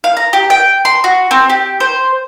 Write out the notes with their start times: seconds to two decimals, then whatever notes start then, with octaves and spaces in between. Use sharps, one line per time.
0.04 F5
0.17 A#5
0.33 G4
0.50 G5
0.85 C6
1.04 F#4
1.31 C4
1.50 G4
1.80 C5